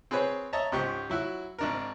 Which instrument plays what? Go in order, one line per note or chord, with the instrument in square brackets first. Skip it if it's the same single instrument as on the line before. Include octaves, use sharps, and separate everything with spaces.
[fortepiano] C4 G#4 B4 C#5
C#5 D#5 E5 A5 A#5
C#2 G#2 G4 C5 C#6
F#3 E4 F#4
G#1 D4 A#4